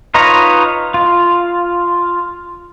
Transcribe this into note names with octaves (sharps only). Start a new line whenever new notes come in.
D#4 F4 B4 C#5 A#5
F4